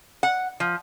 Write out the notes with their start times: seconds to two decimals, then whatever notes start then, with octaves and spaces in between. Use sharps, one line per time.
0.23 F#5
0.60 F3